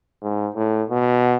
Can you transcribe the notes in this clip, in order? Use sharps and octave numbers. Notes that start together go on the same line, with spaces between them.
G#2
A2
B2